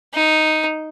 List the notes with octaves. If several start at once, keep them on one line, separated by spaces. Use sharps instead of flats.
D#4